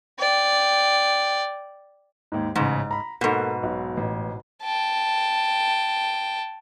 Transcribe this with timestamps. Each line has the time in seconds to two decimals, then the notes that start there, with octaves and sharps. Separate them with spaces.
0.20 D5 G5
2.32 D#2 G#2
2.56 A1 G#2 C#3
2.91 A#5 B5
3.21 G#2 B2 A#3 A4
3.63 B1
3.97 A1
4.64 G5 A5